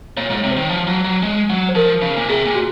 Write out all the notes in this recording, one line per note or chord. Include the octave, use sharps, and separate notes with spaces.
A#2 C#5
G#2
C#5
C3
C5
D#3
F3
F#3
F#3
G#3
F#3
C5
F3 A#4
C#3
A#2
C3 G#4
A#2
F#4